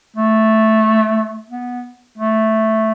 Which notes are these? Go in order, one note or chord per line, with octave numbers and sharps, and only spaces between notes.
A3
B3
A3